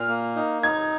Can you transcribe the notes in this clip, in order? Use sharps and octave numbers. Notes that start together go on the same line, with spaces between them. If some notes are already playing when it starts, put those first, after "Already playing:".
Already playing: A#2 F6
A#3
D#4
D#4 G#6